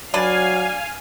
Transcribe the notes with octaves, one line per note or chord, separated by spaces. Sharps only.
F#3 D4 B4 D5 F5 G#5